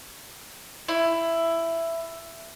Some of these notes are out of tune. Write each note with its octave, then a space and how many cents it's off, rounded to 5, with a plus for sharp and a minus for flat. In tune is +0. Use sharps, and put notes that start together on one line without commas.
E4 +10